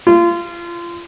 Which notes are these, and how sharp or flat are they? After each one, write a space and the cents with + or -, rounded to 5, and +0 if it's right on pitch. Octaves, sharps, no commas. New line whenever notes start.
F4 -30